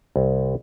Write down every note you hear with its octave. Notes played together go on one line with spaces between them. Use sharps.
C2